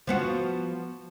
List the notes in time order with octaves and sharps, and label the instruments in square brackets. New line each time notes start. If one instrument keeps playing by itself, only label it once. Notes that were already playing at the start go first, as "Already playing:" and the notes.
[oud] F3 B3 F#4